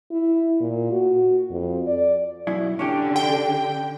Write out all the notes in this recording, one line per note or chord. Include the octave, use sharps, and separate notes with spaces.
E4
A#2
F#4
F2
D5
B1 F#2 E4
D3 C#4 D4 G4
G5